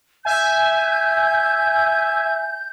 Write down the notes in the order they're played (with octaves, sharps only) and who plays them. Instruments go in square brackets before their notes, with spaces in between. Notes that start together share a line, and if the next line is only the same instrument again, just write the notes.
[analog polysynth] E5 G#5 [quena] G6